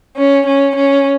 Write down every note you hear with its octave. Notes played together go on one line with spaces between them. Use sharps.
C#4
C#4
C#4